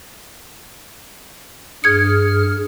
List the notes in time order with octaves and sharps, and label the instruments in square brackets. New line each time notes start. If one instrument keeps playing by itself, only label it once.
[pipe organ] G2 G#4 F6 [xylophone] G#6 C#7